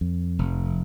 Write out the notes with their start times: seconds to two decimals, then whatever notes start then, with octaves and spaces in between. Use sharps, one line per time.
0.01 F2
0.39 F1